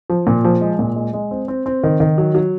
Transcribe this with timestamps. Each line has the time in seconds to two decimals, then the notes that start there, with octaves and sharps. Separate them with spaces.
0.10 F3
0.27 A#2
0.44 F3
0.61 G#3
0.79 A#2
0.96 G#3
1.13 G#3
1.31 C4
1.48 C4
1.66 C4
1.83 D#3
2.00 D#3
2.18 F#3
2.35 F#3